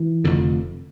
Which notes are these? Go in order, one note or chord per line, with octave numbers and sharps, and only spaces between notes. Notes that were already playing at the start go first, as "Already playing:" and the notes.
Already playing: E3
F1 F2 D3